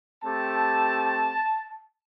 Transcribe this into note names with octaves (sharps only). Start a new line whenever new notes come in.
A3 C4 G4 A5